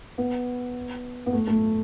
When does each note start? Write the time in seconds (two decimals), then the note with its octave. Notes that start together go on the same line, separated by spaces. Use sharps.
0.18 B3
1.26 B3
1.33 A3
1.47 A3